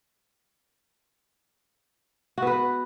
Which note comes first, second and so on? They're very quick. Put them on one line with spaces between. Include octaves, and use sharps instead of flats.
F#4 B3 B4